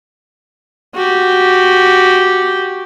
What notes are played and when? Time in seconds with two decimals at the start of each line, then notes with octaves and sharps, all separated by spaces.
0.95 F#4 G4